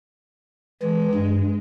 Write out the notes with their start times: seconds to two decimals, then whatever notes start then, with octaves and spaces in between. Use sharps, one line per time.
0.82 E3 G#3
1.15 G2